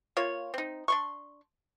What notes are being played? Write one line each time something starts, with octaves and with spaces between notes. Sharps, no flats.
A#3 F4 C#5
C4 D#4
D4 C6 C#6